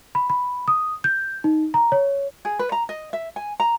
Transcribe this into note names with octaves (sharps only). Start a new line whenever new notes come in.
B5
B5
D#6
G6
D#4
A#5
C#5
G#4
B4
A#5
D#5
E5
G#5
A#5